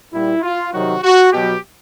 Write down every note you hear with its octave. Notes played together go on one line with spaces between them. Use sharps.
A#2 G3 E4
F4
C3 D#3 F#3 F#4
F#4
B2 F#3 G4